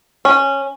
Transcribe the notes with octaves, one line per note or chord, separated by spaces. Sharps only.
C#4